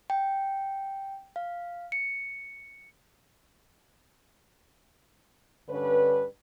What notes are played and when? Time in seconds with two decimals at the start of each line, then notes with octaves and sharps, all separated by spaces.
0.10 G5
1.36 F5
1.92 C#7
5.69 G2 D3 C#4 B4